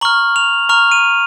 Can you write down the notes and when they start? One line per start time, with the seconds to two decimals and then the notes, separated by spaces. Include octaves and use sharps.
0.01 A#5 C#6 F6 F#7
0.36 F7
0.69 A#5 C#6 F6 F7
0.92 D#7